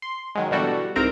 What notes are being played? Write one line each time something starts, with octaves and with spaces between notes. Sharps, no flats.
C6
D#3 F#3 G#3
B2 D3 E3 G3 F#4 A4
C2 G#2 C4 A#4 A#5 D7